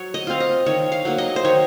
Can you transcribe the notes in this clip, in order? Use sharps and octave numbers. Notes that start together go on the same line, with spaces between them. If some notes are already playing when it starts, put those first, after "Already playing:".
Already playing: F#3 C#5
D#5
C4 F4 F5
D#5
D#3 C#5
F5
F#3 A#3
D#5
C5
D#3 C#5